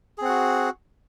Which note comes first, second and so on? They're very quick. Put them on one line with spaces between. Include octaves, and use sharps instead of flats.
G#4 C4 F#5 F#4